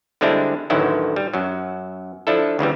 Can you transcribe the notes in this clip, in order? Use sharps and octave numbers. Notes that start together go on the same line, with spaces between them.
D3 G3 G#3 C4 D4 E4
A1 D2 D3 D#3 F#3 E4
G3
F#2 F#3
F3 D4 E4 A4
D2 C#3 E3 G3